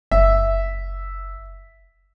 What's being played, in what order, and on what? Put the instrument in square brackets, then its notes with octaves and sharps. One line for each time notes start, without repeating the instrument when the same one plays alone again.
[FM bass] F#1 [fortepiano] E5